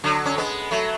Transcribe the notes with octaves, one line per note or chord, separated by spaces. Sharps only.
D3 F#3
C#4
G#3 B3
F#3 A3